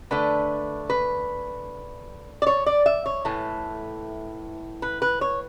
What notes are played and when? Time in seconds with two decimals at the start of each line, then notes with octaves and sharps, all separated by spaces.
0.11 D3 A3 B4
0.90 B4
2.42 D5
2.47 C#5
2.66 D5
2.86 E5
3.06 C#5
3.25 A2 E3 A3
4.82 B4
5.02 B4
5.21 C#5